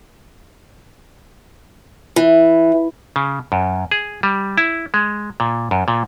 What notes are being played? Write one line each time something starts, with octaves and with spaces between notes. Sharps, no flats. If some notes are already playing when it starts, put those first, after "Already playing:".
E3
C#3
F#2
G#4
G3
E4
G#3
A#2
F#2
A#2